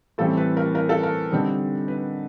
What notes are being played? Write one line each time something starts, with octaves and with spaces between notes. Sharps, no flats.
A2 E3 G3 C4 A4
B4
A#4
A#4
A4
A#4
D3 G3 C4 D#4
B4